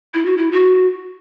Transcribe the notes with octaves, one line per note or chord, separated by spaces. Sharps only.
E4
F#4
E4
F#4